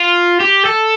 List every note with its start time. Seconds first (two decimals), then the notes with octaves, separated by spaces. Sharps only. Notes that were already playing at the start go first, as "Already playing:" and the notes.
Already playing: F4
0.40 G4
0.65 A4